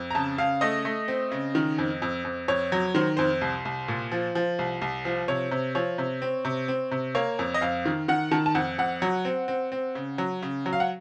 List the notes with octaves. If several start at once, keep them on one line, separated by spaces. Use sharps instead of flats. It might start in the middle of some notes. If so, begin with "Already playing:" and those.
Already playing: F2
A#5
C#3 A5
C#3 F5
A3 D#5
A3
C4
C#3
D#3
F2
F2
F2
F2 C#5
F#3
D#3 C5
F2 C5
C2
C2
A#2
F3
F3
C2
C2
F3
C3 C#5
C3
F3 C#5
C3
C4
C3
C4
C3
A#3 C#5
F2
D#5
F2 F5
D#3
D#3 F#5
D#3 A5
A5
F2 F#5
F2 F#5
F#3
C4
C4
C4
C#3
F#3
C#3
F#3
F5
F#5